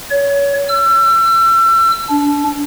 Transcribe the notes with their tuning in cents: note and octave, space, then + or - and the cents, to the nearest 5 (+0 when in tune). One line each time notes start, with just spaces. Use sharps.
C#5 +25
E6 +35
D4 -25